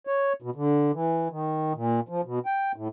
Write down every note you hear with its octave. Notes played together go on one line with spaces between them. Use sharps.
C#5
B2
D3
E3
D#3
A#2
F3
B2
G5
A2